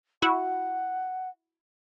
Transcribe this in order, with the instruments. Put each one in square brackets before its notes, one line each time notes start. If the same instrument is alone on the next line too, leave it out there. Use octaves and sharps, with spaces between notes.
[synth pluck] E4 F#4 [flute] F#5